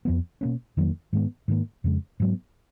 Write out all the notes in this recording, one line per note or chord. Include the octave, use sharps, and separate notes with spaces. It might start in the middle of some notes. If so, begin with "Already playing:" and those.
F2 F3 B3
B2 A#3 C#4
F2 D#3 F#3 A#3
G#2 D#3 G#3 B3
G#2 D#3 A#3
F2 C#3 G#3
G#2 F#3 B3